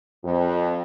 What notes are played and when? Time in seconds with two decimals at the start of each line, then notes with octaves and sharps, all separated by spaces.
0.25 F2